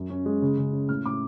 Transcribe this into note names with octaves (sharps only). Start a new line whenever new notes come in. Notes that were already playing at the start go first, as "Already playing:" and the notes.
Already playing: F#2
C#4
G#3
C#3
C#3
C#4
A2 F6
A2 D6